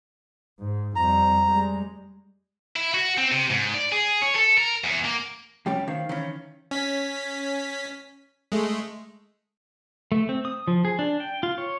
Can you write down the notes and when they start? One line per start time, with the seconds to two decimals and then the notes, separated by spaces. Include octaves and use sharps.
0.59 G#2
0.96 F2 G3 A#5
1.44 G3 G#3
2.76 E4
2.94 F#4
3.18 C4
3.32 C3
3.50 G#2
3.74 D5
3.92 G#4
4.22 C#5
4.35 A4
4.58 A#4
4.84 E2
5.05 A#3
5.66 F2 G3 C#4 G4 G5
5.88 D#3 C5 F5
6.09 D#3 E3 C#4
6.71 C#4 B6
8.52 G#3 A3
10.12 A3
10.29 C4
10.45 D#6
10.68 F3
10.85 G#4
10.99 D4
11.20 G5
11.43 F4
11.58 C#5